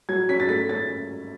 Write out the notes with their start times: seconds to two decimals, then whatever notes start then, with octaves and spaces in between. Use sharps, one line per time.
0.09 F#3 G#6
0.29 C#4 B6
0.40 A6
0.49 A3 B6
0.69 C#4 A6